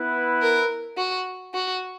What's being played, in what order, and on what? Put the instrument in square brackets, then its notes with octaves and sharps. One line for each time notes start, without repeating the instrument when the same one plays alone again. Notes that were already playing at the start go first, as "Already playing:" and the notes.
Already playing: [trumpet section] B3 E4 B4
[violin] A#4
F#4
F#4